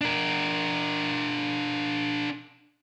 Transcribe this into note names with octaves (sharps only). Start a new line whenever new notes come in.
D4 A#4